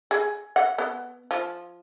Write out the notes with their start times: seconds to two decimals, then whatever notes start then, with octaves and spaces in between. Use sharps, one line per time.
0.11 G#4
0.56 F#5
0.78 B3
1.31 F3